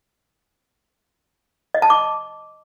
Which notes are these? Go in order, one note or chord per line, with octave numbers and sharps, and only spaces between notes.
D#5
A5
D6